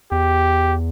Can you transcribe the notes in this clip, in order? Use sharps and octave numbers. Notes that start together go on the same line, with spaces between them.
E2 G4